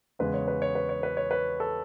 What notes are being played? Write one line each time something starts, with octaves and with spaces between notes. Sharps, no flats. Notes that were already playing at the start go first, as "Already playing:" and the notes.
E2 C#3 G#3 B4
C#5
B4
C#5
B4
C#5
B4
C#5
B4
A4